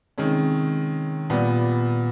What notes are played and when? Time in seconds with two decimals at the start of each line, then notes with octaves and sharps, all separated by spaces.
0.18 C3 D#3 G#3 C#4
1.30 A#2 G3 B3